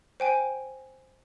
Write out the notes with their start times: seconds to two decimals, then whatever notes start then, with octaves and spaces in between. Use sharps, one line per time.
0.20 C5 G5 G#5